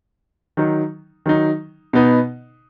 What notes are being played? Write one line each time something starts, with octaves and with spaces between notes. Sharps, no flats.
D#3 F#3 D#4
D#3 F#3 D#4
B2 B3 D#4